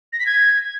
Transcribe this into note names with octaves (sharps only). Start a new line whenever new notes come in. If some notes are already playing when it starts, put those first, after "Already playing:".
A#6
B6
G#6